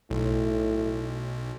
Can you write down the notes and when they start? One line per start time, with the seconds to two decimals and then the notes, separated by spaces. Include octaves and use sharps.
0.10 B1 A2